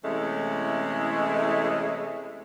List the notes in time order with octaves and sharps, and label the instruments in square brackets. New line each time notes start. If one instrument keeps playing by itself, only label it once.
[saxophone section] C3 E3 G#3 A3 C#4 E4